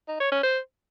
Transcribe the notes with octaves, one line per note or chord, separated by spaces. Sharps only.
D#4
C#5
C#4
C5